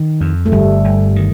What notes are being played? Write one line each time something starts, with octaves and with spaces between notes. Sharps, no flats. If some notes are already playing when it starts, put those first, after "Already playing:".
Already playing: D#3
F2
A3
G1 G3
G1
D#3